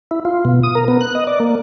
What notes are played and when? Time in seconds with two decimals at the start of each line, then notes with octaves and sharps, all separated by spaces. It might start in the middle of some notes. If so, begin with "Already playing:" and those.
0.11 E4
0.25 F4
0.45 B2
0.63 D#6
0.75 A#4
0.88 B3
1.01 F#6
1.15 D#5
1.27 D5
1.40 A#3